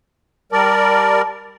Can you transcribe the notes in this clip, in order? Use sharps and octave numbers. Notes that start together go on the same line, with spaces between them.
G3 A#4 D5 A5